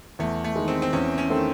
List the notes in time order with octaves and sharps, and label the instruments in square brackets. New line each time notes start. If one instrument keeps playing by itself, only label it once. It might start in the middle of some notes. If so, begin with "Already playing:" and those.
[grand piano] E2 [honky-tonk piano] A3
[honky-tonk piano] A3
[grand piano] D#3 G#3
[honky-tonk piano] C4
C4
[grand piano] E2 [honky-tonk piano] C#4
[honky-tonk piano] C#4
[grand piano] D#3 A3 C4